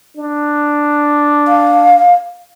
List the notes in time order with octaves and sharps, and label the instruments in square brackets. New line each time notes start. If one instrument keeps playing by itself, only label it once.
[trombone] D4
[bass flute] F5